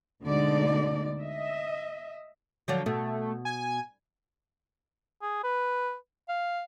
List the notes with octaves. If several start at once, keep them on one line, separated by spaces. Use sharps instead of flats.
D2 B2 D3 G#3 D#4 D5
D#5 E5
D3 F3 F#3
B2 A3
G#5
G#4
B4
F5